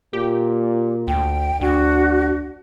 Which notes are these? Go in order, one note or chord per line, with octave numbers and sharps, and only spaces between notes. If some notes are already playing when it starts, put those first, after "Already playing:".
A#2 G4
D2 G5
D2 D4 F#4